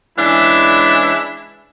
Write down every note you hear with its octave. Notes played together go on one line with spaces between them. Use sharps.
E3 G#3 C#4 D4 E4 E5